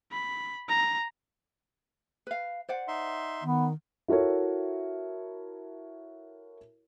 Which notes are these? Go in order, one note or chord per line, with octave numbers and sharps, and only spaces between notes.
B5
A#5
B4 F5
C5 D5 F#5
D#4 E5 C6
D#3 B3
E4 F#4 A4 A#4 C#5